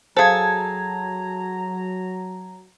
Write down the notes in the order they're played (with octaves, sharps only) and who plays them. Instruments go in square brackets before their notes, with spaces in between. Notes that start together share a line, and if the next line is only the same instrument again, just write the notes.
[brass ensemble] F#3 A#5 [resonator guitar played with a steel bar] G#4 A4 [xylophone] C5 F5 [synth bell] A5 G#6